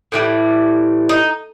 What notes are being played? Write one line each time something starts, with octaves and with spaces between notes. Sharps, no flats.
A2 E3 G3
D#4